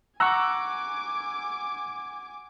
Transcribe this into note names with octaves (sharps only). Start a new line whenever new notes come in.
F#5 G#5 A#5 C#6 D6 E6 F#6